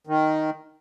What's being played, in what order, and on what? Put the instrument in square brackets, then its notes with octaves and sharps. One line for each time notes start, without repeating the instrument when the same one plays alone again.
[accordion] D#3